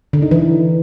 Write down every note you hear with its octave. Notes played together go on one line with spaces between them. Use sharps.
D3
D#4
E3